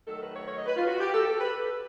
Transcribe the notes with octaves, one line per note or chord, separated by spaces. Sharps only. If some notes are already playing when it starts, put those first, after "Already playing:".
D#3 F#3 A3 A4
B4
C#5
C#5
D#5
B4
F4
F#4
G4
A4
A4
B4